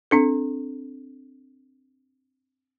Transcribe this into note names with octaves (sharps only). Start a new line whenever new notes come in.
C4 D4 A4